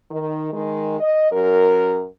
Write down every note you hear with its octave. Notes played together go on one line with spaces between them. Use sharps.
D#3
D#3 G#3
D#5
F#2 A#4